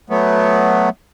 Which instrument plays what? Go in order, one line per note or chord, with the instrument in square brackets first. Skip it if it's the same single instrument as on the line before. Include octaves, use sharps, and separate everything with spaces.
[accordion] F#3 A3 B3